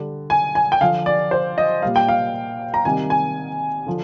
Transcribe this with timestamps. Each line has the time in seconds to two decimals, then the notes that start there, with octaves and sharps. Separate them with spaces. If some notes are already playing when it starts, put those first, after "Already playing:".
Already playing: D3 G3
0.30 G#5
0.55 G#5
0.72 G5
0.81 D3 F3 F5
1.06 D5
1.31 C5
1.58 D#5
1.82 A#2 G3 F5
1.96 G5
2.08 F5
2.74 A#5
2.85 C3 D#3 G3 G#5
3.10 G#5
3.86 D3 F3